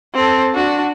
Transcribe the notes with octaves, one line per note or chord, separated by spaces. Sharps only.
C4 A4
D4 F#4